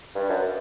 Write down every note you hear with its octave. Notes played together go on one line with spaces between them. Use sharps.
G2
F#2